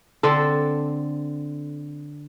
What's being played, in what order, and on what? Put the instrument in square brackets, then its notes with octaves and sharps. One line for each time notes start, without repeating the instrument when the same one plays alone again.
[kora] D3 C4 A4